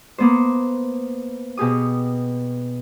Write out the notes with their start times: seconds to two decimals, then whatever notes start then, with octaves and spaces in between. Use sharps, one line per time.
0.18 A#3 B3 C5
1.57 B2 G4 G#4 D#6